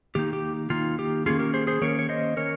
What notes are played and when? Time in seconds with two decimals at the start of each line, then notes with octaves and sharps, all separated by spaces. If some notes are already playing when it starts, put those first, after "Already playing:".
0.15 D#3 A#3 D#4 G4
0.33 G4
0.70 D#3 A#3 D#4 F4
0.99 G4
1.26 D#3 A#3 C#4 F4 G#4
1.39 G4 A#4
1.53 G#4 C5
1.67 G#4 C5
1.81 D#3 A#3 C#4 A#4 C#5
1.99 C#5
2.09 C5 D#5
2.37 D#3 A#3 C#4 A#4 C#5